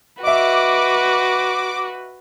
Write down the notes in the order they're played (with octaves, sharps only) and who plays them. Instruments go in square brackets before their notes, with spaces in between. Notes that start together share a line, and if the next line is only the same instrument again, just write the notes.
[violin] F#4 [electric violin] B4 [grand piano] D#5 E5 [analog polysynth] D6